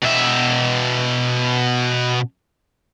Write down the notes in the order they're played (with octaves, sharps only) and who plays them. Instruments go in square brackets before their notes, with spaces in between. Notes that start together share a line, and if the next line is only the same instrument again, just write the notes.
[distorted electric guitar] B2 E5